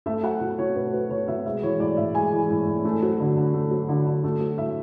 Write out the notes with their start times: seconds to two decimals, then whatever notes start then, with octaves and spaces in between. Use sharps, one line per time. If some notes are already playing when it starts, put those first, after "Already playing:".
0.06 A3 E5
0.23 F#3 F#5
0.41 B2
0.58 B2 C#5
0.76 A3 B4
0.93 F#3 B4
1.10 B2 C#5
1.28 B2 E5
1.46 G#3 E5
1.62 E3 C#5
1.80 A2 D5
1.97 A2 E5
2.15 G#3 G#5
2.33 E3
2.50 A2
2.67 A2
2.85 A3
3.02 F#3
3.20 D3
3.37 D3
3.54 A3
3.71 F#3
3.89 D3
4.06 D3
4.24 A3
4.41 F#3
4.58 A2 E5